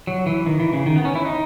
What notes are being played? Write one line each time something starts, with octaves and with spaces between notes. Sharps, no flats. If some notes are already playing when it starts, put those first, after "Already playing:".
F#3
E3
D#3
E3
C#3
D#3
B3
C#4
E4
D#4